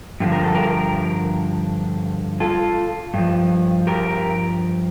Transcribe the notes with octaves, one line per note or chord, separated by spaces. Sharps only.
G2 D3 F3
A#4
A4
G4 A#4
F4 A4
G2 F3
G4 A#4